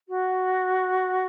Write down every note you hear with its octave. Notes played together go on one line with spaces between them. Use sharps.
F#4